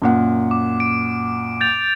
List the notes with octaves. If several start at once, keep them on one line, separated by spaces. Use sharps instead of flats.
F#2 A#2 F#5
D6
D7
G6 A6 F7